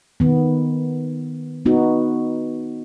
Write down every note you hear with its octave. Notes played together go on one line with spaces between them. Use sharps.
D#3 B3
B3 D#4 F#4